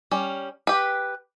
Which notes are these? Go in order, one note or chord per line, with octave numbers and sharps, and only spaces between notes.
G3 C#4
G4 B4